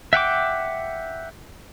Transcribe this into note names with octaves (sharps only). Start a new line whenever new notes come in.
E5 F#5 G5 D6